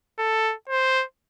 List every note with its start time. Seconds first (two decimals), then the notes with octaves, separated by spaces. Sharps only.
0.19 A4
0.69 C5